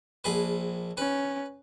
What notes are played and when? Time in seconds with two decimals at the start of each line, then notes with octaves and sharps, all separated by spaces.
0.24 A#1 G#4 B4
0.97 C#4 B4